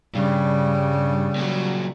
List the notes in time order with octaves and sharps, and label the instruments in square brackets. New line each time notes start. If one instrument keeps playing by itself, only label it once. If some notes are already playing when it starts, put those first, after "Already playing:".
[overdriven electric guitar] G2 [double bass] C#3 G3
[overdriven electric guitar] A#2 F#3